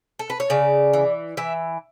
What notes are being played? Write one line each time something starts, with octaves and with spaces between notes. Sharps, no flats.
A4
B4
C#5
C#3 D5
E3
E3 E5